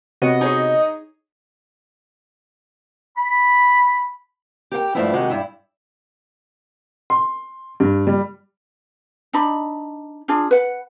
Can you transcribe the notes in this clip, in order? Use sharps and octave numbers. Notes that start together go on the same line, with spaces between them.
C3 B3 F#4 C#5 D#5 F#5
D#4 G#4 C#5 G#5
B5
G4 A#4 F#5 G5
G2 F3 A3 B3 E4
C3 D#3 G#3 D#4 F#4 G4
G2 E4
C6
G2
G3
D4 D#4 B5
D4 F4 G#4
B4 F#5